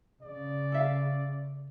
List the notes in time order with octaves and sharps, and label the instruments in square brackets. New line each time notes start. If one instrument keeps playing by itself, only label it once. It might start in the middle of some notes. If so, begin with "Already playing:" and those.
[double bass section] C#3 [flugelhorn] D5
[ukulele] A4 E5 F5